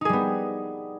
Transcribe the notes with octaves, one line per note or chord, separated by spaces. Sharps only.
G3 B3 D#4 G#4